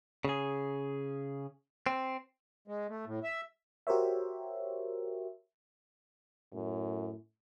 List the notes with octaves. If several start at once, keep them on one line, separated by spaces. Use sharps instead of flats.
C#3 G#4
C4
G#3
A3
A2
E5
F#4 G4 A#4 C5 C#5 E5
F#2 A2